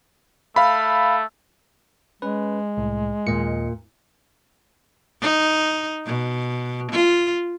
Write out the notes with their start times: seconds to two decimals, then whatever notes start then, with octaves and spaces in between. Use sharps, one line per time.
0.56 A3 F5 B5
2.22 G#3 C#4 B4
2.77 C2 A2
3.27 D#2 A#2 D#5 C#7
5.21 D#4
6.06 B2
6.92 F4